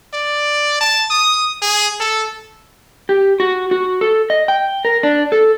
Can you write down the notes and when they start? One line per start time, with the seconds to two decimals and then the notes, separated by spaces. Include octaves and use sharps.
0.14 D5
0.81 A5
1.10 D#6
1.62 G#4
2.00 A4
3.09 G4
3.40 F#4
3.71 F#4
4.01 A4
4.30 D#5
4.48 G5
4.85 A#4
5.03 D4
5.32 A4